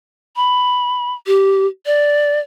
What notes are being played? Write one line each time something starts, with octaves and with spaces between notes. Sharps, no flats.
B5
G4
D5